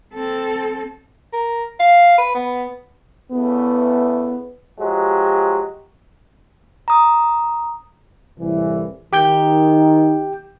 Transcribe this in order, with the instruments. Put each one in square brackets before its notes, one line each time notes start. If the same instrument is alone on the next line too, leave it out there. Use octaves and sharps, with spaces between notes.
[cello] C4 A4
[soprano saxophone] A#4
F5
B4
B3
[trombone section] E2 C#3 A3 [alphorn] B3
[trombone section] F3 F#3 G#3 [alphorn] G4
[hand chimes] A#5 D#6
[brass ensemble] C2 A2 E3
[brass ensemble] D#3 [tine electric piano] G4 G5 G6